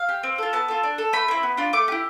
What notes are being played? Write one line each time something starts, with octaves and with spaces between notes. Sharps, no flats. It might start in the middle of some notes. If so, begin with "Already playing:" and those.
Already playing: F5
G4
C4
F4 A4
B3 A5
F4 A4
D4
A4
A3 B5
C4 E4
B3
D4 F4
A3 D6
E4 G4